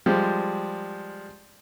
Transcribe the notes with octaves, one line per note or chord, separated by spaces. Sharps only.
F3 G3 G#3